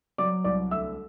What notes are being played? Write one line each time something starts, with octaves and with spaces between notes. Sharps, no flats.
F#3 D5 D6
C2 D5 D6
D2 E5 E6